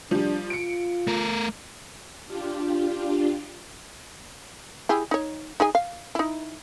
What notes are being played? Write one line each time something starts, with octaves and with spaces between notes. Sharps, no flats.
F3 G3 D4
F4 C#7 D7
A3 A#4
D4 F4 G4
E4 G4 G#4
D#4 C#5
D#4 G#4 G#5
F5
D#4 E4